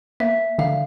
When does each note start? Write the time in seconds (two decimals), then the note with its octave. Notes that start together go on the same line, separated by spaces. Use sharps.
0.20 A#3 E5
0.59 D3 F5